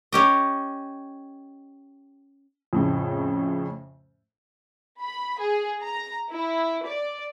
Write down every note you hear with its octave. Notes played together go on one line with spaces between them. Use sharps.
C#4 G4 D#5
F2 A2 C#3
B5
G#4
A#5
E4
D5